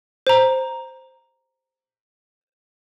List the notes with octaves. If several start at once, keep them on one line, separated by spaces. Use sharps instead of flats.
C5 A#5